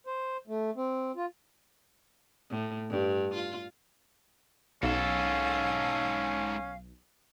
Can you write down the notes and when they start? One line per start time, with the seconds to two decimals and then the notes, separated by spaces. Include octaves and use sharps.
0.07 C5
0.47 A3
0.76 C4
1.16 F4
2.50 A2
2.90 G2
3.34 F4
4.83 B1 G#2 C#4 A4 F5